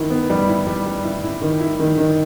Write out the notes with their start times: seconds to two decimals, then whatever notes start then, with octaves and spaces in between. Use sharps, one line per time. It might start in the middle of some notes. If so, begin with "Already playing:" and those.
Already playing: D#3 E4
0.10 B3
0.30 G3
0.48 E4
0.67 G3
0.86 G3
1.04 E4
1.23 E4
1.42 D#3
1.60 E4
1.79 D#3
1.98 D#3